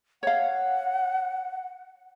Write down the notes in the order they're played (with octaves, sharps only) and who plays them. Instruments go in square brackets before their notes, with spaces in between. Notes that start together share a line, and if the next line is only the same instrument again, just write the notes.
[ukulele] C#5 F5 [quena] F#5